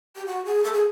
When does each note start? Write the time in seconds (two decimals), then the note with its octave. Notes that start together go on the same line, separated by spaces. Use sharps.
0.16 G4
0.26 F#4
0.45 G#4
0.64 A4
0.73 G#4